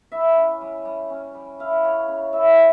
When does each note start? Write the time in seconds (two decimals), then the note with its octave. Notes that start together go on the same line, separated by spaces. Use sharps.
0.12 E4 E5
0.36 C#4
0.61 G3
0.85 G3
1.10 C#4
1.35 G3
1.59 E4 F5
1.84 C#3 C#5
2.08 C#3
2.33 E4 E5